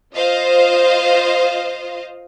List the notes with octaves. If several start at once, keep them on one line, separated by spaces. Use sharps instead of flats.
F4 C5 D#5 F5